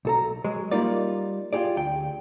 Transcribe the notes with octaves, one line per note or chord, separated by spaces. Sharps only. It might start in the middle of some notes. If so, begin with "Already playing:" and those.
B1 A4 A#5
F#3 G#3
G3 A#3 D#4 F4 D5
F4 G4 G#4 D5
D2 G5